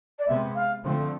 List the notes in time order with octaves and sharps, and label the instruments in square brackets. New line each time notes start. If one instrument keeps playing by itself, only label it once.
[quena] D5
[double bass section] C3 G#3 B3 [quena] E5
[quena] F5
[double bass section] D3 F3 A3 C4